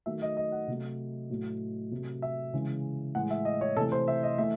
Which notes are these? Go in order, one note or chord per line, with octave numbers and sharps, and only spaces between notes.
D#3 F#3 A3 E5
D#5
D#5
F#5
C3 F#3 A3
A2 F#3 A3
C3 F#3 A3
E5
C#3 E3 G#3
A2 E3 G#3 F#5
E5
D#5
C#5
C3 E3 A3 A4
C5
E5
D#5
E3 A3 E5